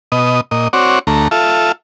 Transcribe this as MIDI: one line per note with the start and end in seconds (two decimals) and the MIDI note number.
0.12 0.41 47
0.12 0.41 75
0.51 0.68 46
0.51 0.68 75
0.73 0.99 60
0.73 0.99 66
0.73 0.99 73
0.73 0.99 74
1.07 1.28 38
1.07 1.28 57
1.07 1.28 82
1.31 1.72 65
1.31 1.72 69
1.31 1.72 76